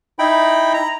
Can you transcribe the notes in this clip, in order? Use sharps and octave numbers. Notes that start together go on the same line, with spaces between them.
D#4 E4 G5 B5
A#5